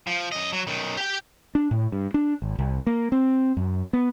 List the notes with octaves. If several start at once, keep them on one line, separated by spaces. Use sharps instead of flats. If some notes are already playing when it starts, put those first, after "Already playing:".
F3
F#2 D#5
F#3
B1 D#3
G4 G5
D4
A2
G2
D4
G#1
C2
A#3
C4
F#2
B3